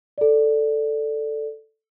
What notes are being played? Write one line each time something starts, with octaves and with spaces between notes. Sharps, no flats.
A4 D5